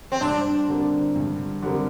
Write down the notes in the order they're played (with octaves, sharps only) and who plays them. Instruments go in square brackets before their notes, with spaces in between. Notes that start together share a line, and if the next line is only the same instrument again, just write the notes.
[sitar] C4
[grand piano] G2 [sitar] D4
[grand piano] D3 G3 C4 A#4
G2
D3 G3 C4 A#4